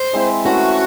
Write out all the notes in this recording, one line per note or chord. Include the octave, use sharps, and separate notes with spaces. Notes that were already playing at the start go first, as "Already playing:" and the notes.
Already playing: C5
G#3 C4 E4
E3 A3 C#4 F#4